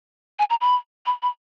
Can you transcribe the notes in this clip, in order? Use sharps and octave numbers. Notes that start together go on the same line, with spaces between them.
G#5
A#5
B5
B5
B5